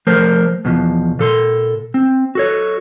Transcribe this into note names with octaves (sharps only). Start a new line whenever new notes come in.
F3 A3 A#4 C5
E2 B2 F3
A#2 A4 C6
C4
F#4 A4 C#5